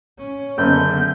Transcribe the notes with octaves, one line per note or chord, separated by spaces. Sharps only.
C#4
F#1 D3 B3 G6